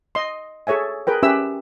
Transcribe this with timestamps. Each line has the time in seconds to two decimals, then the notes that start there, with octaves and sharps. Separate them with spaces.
0.15 D#5 C6
0.67 G#4 A4 C#5 E5 G#5
1.07 G#4 A#4 B4 G5
1.23 C#4 G4 B4 E5 E6